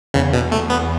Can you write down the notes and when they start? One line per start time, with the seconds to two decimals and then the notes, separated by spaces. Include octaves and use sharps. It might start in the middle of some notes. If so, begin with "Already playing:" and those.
0.14 E2 C#3
0.33 B2
0.52 A3
0.70 B3